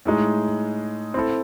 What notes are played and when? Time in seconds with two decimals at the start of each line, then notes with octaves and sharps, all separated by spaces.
0.05 A2 G#3 D#4 G#4
1.14 C4 E4 A4